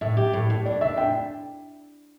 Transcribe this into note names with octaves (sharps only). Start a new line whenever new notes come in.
A2 E5
G4
A2
A2
D4 D5
D4 E5
A2 G5